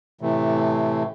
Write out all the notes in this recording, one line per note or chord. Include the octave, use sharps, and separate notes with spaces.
A2 C3 E3 A3